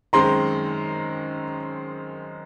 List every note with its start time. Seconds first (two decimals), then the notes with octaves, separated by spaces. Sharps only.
0.13 F#2 D#3 G#3 C4 A#5 C6